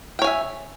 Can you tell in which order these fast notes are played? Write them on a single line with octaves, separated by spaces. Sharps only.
G5 C#5 G#5 E5